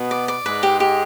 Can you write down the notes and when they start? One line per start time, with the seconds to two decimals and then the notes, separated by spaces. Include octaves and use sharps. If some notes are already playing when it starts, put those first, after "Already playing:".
Already playing: B2 B3
0.11 D5
0.28 D5
0.46 G#2 G#3 B4
0.63 G4
0.80 G4